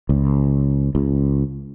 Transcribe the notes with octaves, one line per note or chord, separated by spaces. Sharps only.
C#2
C#2